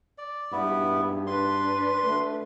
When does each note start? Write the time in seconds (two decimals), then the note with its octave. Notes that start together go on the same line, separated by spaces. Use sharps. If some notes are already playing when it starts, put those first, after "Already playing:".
0.18 D5
0.52 G2 B3 E4
1.27 D4 B4 C6
2.05 A3